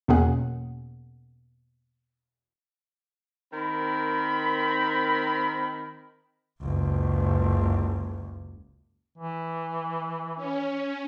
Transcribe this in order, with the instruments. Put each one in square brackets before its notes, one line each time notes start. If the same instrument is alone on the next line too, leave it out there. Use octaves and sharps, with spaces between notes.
[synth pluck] E2 B2 A#3 C#4 G#4 F#5
[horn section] D#3 C4 A#4 B5
[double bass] F#1 C#2
[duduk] E3
[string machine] C#4